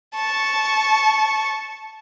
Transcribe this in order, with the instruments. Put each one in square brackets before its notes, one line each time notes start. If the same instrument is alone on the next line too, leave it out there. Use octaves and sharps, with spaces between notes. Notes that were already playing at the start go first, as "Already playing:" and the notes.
[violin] A5 C#6